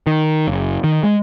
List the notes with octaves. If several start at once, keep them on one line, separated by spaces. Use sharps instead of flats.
D#3
F#1
D#3
G#3